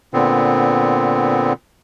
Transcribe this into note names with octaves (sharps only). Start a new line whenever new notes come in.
A#2 D3 B3 C4